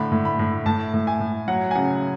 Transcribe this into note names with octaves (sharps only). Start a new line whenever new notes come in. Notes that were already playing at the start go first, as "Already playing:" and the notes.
Already playing: A2 D3 B5
A2
B5
A2
A2 A5
A2
G#5
A2
F#3 F#5
G#5
C#3 F#5